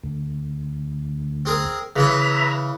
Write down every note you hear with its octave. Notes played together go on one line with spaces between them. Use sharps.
D2
C4 G#4 A#4
C#3 E3 B4 C#5 E5 A#5